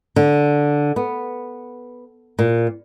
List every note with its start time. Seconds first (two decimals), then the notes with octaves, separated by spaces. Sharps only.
0.16 D3
0.96 B3
2.39 A#2